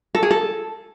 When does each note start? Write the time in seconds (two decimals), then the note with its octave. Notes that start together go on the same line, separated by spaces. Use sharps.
0.15 A4
0.23 G#4
0.31 A4